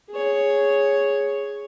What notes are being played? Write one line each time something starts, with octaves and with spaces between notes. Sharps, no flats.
G#4 C#5